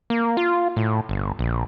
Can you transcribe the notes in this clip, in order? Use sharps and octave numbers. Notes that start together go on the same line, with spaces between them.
A#3
F4
A2
G1
A#1